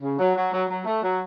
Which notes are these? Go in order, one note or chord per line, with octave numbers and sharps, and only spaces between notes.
C#3
F#3
F#3
F#3
F#3
A3
F#3